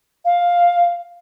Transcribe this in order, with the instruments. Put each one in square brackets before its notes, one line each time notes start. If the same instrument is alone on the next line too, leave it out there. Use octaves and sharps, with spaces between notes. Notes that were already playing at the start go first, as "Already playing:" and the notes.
[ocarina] F5